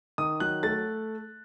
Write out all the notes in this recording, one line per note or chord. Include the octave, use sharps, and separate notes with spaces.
D#3 D#6
F#3 F#6
A3 A6